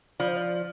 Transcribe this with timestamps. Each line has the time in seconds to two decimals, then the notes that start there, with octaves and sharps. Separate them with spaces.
0.19 F3 D5
0.28 C5
0.36 D5